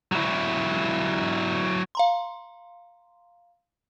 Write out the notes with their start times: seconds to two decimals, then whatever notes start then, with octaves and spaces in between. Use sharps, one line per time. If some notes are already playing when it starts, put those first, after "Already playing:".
0.12 F#3 E4
1.95 F5 A#5 C6